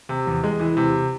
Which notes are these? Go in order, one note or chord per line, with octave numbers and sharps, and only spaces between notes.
C3
E2
G#3
E3
C3